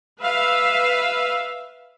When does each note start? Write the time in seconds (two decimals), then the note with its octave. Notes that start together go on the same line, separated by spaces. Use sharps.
0.21 B4 E5 F5